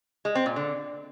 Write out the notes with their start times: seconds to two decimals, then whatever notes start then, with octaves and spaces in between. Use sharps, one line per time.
0.25 G#3
0.35 C4
0.46 A#2
0.56 D3